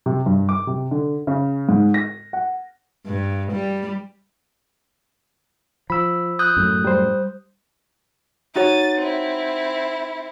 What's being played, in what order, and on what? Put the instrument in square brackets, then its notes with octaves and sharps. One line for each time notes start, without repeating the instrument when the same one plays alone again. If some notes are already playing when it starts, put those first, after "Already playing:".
[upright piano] C3
G2
D6
C3
D3
C#3
G#2
A#6
F#5
[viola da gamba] G2
G3
[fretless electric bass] F3 [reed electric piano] B5 E6
[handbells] D#6 F#6 G6
[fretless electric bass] F#2 A2
[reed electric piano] G3 C5
[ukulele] D#4 F#4 C#5 [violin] A6 D#7
[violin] C4 E4